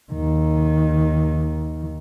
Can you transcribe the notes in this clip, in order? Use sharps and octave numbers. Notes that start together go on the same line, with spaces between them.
D#2 D#3